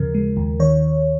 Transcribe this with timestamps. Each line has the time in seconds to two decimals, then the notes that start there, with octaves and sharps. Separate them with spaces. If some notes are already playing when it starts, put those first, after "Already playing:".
Already playing: D#2 C#3 F3 A#4
0.14 G#3
0.37 D#2
0.60 D#3 C#5